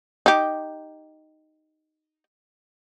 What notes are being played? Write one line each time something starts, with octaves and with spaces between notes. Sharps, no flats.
D#4 G4